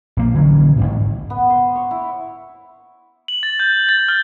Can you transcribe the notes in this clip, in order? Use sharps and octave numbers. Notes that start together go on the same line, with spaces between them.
A#1 A#3
D3 E3 F#3 C#4
A1 D2 G#2 C3
B3
C5
C#5
E4
F#7
A6
G6
A6
F6